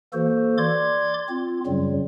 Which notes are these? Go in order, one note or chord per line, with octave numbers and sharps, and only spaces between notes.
E3 A#3 F#4 A4 C5
D5 C6 D6 G#6
C4 F4
F#2 C#3 F#3 G3